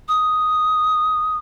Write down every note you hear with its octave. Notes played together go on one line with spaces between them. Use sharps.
D#6